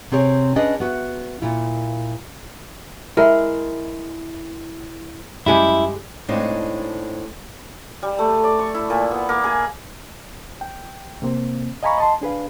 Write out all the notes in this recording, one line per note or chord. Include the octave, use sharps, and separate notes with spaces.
C3 C4 G#4 C#5
C#4 D4 G#4 B4 D#5
B3 F#4 E5
A#2 E4 F4
G#3 E4 A#4 E5
F#2 G3 G#3 E4 G4 G#5
A2 G#3 C4 D4 D#4 F4
G3
A3
D5
C#6
E4
A#2
B3
A#3
G#4
G5
C3 A#3 C4
D#5 F5 G#5 A#5 B5 C#6
D#5 A5 C6
D4 G#4 B4 F5